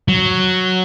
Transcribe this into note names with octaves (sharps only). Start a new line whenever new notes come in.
F#3